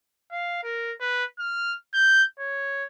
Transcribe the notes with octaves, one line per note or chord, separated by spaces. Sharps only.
F5
A#4
B4
F6
G6
C#5